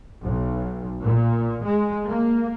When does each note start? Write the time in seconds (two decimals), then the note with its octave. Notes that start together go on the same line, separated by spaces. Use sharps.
0.23 B1
1.03 A#2
1.64 G#3
2.07 A#3